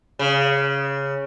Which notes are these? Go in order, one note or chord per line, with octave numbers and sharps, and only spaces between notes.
C#3